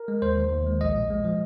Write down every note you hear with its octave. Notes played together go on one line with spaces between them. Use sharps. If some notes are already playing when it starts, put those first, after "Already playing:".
Already playing: A#4
G#3
D#2 C5
D#3
D#2
G#3
A#1 D#5
A#2
G#3
F3